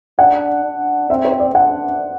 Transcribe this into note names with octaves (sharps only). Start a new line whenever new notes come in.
D4 F#5
D4
C4 E5
C5
D5
D4 F#5